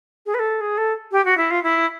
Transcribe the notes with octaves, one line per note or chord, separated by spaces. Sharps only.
G#4
B4
A4
G#4
A4
G4
F#4
E4
F4
E4